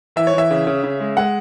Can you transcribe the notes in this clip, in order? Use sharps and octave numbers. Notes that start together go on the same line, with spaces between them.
E3 E5
C#5
E3
E5
C#3
C#3
C#3
G#3
G#3 F#5